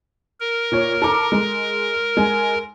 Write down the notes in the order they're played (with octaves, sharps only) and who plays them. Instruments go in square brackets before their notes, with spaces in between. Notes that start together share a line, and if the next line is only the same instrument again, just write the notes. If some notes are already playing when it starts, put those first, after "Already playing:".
[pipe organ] A#4
[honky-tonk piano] A#2 C#5
A4 A#5 D6
G#3
G#3 G#5